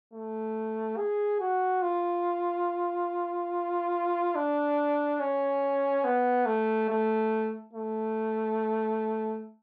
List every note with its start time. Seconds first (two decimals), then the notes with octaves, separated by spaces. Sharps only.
0.13 A3
0.97 G#4
1.40 F#4
1.82 F4
4.35 D4
5.20 C#4
6.04 B3
6.46 A3
6.89 A3
7.74 A3